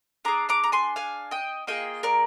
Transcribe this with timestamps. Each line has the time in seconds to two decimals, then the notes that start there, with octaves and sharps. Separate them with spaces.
0.25 D4 G#4 A#5 D6
0.49 A#5 D6
0.64 A#5
0.72 G#5 C6
0.96 F5 G#5
1.31 D#5 G5
1.67 A#3 F4 G#4 D#5 G5
2.03 A#4 D5